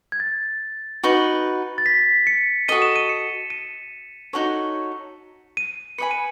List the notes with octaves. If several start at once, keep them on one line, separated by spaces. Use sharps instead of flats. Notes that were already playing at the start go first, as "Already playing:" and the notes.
G#6
A6
D#4 F#4 B4
A6
B6
C#7
F#4 A4 D#5 D#7
E7
D#7
C#7
D#7
D#4 F#4 A4 C#5
D#7
B4 D#5 G#5 B5 C#7
D#7